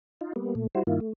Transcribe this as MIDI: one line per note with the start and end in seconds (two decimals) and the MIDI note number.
0.21 0.33 63
0.21 0.33 65
0.36 0.55 55
0.36 0.55 58
0.36 0.55 59
0.55 0.67 46
0.55 0.67 57
0.75 0.83 55
0.75 0.83 64
0.75 0.83 66
0.75 0.83 72
0.87 1.00 43
0.87 1.00 51
0.87 1.00 58
0.87 1.00 64
0.87 1.00 65
1.00 1.13 57